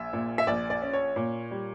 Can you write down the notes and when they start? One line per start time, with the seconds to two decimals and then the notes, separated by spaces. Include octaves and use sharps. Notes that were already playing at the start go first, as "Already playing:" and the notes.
Already playing: A#1 E5
0.13 A#2
0.38 E5
0.47 A#1 D5
0.70 D5
0.82 C#4
0.93 C#5
1.16 A#2
1.51 G3